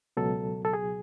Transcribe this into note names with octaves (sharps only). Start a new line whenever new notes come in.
C#2 B2 F#3 A4
A4
G#4